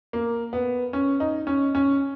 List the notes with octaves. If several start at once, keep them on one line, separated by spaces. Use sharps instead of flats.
A#3
B3
C#4
D#4
C#4
C#4